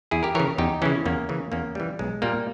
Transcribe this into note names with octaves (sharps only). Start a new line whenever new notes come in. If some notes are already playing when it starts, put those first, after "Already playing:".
E2 E4 G#4
G4 A#4
C#3 E3 A#4 C#5
E2 D#4 G4
C#3 E3 C#4 E4
E2 A#3 C#4
C#3 E3
E2 A#3 C#4
C#3 E3 G3
B1 G#3
A#2 G3 A#3